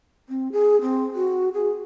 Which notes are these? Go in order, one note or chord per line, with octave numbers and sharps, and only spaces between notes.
C4
G#4
C4
F#4
G#4